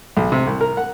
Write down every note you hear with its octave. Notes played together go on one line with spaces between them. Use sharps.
B1
C3
C2
A#4
F#5